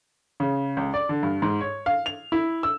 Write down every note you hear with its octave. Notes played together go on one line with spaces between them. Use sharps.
C#3
C#2
D5
D3
G2
G#2
C#5
F5
F7
E4
E6